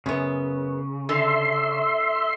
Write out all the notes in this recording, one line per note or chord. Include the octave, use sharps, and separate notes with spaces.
F#2 C#3 B3
D3 E5 C6